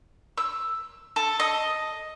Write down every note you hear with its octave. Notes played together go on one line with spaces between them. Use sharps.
E6
A4
D#5